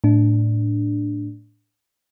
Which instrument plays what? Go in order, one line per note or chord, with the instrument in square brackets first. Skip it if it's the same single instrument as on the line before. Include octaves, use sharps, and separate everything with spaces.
[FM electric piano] A2 D4